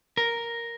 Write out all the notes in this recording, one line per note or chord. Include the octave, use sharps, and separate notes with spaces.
A#4